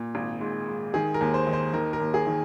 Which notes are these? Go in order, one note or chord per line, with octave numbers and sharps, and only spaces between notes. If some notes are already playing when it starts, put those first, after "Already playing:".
Already playing: A#2
G#1
G#2
G#2
D#3 G#4
A#4
D#2
C5
D#3
C5
D#3 A#4
A#4
D#2
G#4
D#3